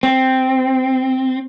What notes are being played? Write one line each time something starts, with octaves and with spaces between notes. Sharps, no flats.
C4